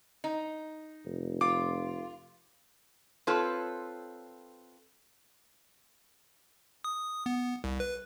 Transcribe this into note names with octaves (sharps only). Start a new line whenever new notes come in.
D#4
F1
F4 D6
C4 F4 A4 B4 C#5
D#6
B3
C2
B4